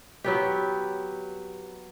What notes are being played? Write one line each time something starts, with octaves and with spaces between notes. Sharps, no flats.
F#3 B3 G4